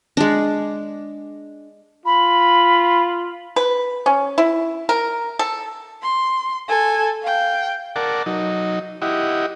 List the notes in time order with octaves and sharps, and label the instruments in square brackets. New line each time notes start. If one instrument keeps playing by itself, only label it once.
[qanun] G#3 D4
[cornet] F4 [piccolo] B5
[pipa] B4
C#4
E4
A#4
A4
[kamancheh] C6
A4 G#5
F5 G5
[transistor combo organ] A#4 D5 F#5 A5
F#3 D#4
E4 G4 D#5 F#5